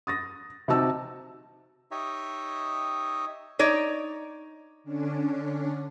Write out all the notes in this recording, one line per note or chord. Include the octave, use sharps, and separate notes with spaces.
D#6 A6 A#6
C3 D#4 F#4 A5 E6
D#4 G4 C#5 D#5 E5
D#4 C#5 D5
D3 C#4 D4